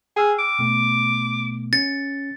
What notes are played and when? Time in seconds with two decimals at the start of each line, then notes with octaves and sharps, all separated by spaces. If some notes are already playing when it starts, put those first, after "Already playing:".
0.16 G#4 G5 E6 F6
0.39 D6
0.59 B2 A3 B3
1.73 C#4 A6 C#7